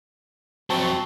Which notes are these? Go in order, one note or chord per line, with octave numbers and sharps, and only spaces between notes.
F2 F#3 C4 A5 C#6